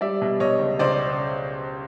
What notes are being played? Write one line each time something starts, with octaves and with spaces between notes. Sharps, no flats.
G3 D5 E5
B2
B2 C#5 D#5
C#2
C#2 C5 D5